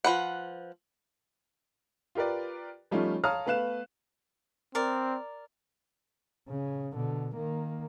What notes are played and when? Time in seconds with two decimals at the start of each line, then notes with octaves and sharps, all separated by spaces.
0.04 F3 B4 F#5
2.15 F4 G4 A#4 B4 D5
2.91 F3 G3 A3 C#4 D#4 F4
3.24 C#5 F5 A5 A#5 D#6 F6
3.46 A3 B3 B4 F5 F#6 E7
4.75 C4 A#4 D5
6.49 C#3
6.94 B2 D3
7.36 D#3 A#3